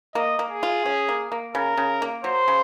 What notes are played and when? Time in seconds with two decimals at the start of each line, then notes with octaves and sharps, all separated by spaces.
0.15 A#3 D#5
0.39 A#3
0.50 G#4
0.63 F4
0.86 C#4
1.09 A#3
1.32 A#3
1.55 C#3 A#4
1.77 C#3
2.02 A#3
2.24 F#3 C5
2.48 C#3